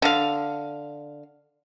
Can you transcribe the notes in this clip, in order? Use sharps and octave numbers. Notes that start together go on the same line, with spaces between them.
D3 F5